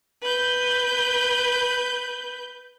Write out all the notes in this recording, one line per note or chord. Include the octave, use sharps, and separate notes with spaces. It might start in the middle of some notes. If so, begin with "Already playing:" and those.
B4 G6